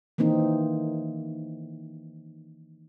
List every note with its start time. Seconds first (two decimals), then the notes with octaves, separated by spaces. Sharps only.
0.18 D#3 E3 A#3 C4 D#4